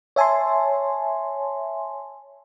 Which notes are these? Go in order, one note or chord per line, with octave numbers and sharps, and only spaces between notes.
C#5 E5 G#5 A5 C6